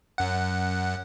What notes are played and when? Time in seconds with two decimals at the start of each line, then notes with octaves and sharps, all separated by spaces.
0.18 F#2 F#5